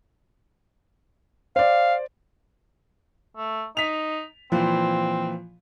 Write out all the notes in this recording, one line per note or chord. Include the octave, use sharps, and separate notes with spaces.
C5 D5 F5
A3
D#4 B6 F7
A#2 E3 F3 C4